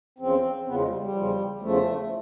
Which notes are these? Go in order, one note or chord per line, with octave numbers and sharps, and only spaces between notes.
E2 C#3 F3 C4
E2 C#3 F3 B3
G#3
G3
G3
E2 C#3 F3
E2 C#3 F3 A3